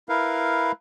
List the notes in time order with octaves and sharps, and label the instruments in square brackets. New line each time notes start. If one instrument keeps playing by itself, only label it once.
[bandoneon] E4 A#4 B4 F5